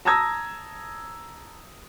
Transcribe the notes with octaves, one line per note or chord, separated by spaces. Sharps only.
A5 A#5 D#6 E6 G#6 A#6